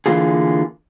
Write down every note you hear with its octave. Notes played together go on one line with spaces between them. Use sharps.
D3 E3 A#3 F4 G#4